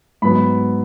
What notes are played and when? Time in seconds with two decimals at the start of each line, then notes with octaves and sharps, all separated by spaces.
0.22 G#2 F#3 B3 B5